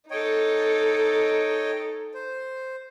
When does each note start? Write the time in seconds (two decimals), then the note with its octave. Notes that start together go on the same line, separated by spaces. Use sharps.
0.11 D#4 A4 C#5 D#5 G5
2.14 C5